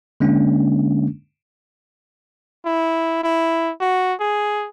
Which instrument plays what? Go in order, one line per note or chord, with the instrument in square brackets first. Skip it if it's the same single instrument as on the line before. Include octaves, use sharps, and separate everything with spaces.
[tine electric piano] D3 G#3 A#3 C#4 D4
[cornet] E4
E4
F#4
G#4